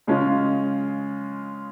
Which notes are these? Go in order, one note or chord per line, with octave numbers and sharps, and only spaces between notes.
C#3 G#3 C#4 F4